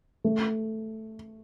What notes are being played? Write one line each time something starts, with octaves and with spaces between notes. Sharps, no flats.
A3